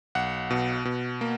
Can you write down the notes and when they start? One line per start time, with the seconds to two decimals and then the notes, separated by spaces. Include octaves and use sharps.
0.15 B1 F#5
0.50 B2
0.85 B2
1.21 A#3